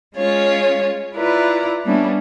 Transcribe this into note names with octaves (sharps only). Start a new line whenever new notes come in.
G#3 C#4 F4 C#5
E4 F4 B4 D5 A#5
G3 A#3 B3 C#4 D4 E4